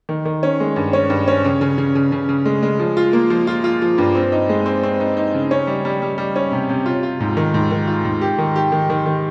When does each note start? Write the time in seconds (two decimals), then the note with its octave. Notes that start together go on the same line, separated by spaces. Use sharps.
0.09 D#3
0.25 D#3
0.43 C#4
0.60 G#3
0.76 G2
0.93 C#4
1.10 G2
1.28 C#4
1.45 C#3
1.61 C#3
1.78 C#3
1.95 C#3
2.12 C#3
2.29 C#3
2.45 G#3
2.63 G#3
2.79 F3
2.97 F4
3.13 A#3
3.30 F3
3.47 F4
3.64 F4
3.82 F3
3.98 G2
4.15 C4
4.32 D#4
4.49 G#3
4.66 C4
4.83 C4
5.00 D#4
5.17 D#4
5.34 C#3
5.51 C#4
5.67 G3
5.85 G3
6.02 G3
6.18 G3
6.36 C#4
6.52 C3
6.69 C3
6.86 F4
7.03 F4
7.20 G#2
7.37 D#3
7.54 G#2
7.71 D#3
7.87 F4
8.05 G#2
8.21 G4
8.39 D#3
8.56 G4
8.72 D#3
8.90 D#3
9.06 D#3